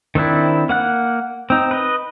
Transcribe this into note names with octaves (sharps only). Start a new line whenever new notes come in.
D#3 C4 D4 E4
A#3 F#5 F#6
C4 D#4
B4 D#5